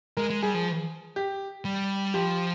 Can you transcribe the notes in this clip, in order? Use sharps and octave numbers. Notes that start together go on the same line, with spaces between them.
G#3 A#4
G#3
G3 G#4
F3
G4
G3
F3 G4